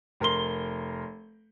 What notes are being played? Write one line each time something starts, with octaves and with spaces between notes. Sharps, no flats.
F1 A#4 C6 G7